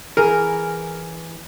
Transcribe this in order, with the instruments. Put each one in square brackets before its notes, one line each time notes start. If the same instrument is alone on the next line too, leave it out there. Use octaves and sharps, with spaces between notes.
[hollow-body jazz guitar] E3 G#4 [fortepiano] A#4